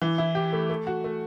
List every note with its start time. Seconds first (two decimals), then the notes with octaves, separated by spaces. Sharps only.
0.02 E3
0.18 E4
0.35 G4
0.53 A3
0.70 A3
0.87 F#4
1.04 A3